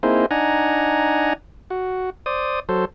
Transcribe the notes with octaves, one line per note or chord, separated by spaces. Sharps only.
A#3 C4 D#4 E4 G#4 C5
D4 D#4 F#5 G#5 A#5
F#4
C5 D5 D#6
F#3 A4 C5